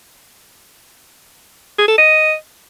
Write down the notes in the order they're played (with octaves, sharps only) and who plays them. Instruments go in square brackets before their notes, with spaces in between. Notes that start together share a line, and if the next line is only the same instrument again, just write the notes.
[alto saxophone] G#4
A4
D#5